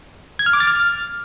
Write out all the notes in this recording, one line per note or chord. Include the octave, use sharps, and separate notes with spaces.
G#6
F6
D6
A6
F6